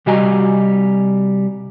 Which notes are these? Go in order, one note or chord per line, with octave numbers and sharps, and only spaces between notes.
C3 G3 F#4 D#5 G#5 A#5